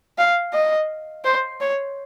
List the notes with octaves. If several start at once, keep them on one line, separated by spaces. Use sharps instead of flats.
F5
D#5
C5
C#5